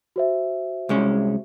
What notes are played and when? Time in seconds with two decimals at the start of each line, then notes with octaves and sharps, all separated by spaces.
0.16 F#4 C5 E5
0.89 C2 G#3 C#4